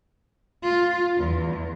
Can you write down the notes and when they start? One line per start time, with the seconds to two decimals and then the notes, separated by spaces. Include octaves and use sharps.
0.63 F4
1.17 E2